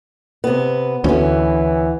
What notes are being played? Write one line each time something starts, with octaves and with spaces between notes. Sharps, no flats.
C3 B3
D2 E3 B3 C#4